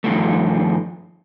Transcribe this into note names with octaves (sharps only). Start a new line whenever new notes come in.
G2 D#3 F3 A3